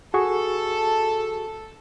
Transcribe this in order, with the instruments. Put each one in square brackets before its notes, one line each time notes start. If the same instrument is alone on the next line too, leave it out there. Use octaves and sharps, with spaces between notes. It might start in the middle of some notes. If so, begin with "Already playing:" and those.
[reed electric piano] F#4 G#4 C#6 [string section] A4